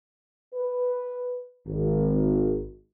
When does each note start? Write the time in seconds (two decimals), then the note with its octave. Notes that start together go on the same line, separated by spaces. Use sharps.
0.53 B4
1.67 G#1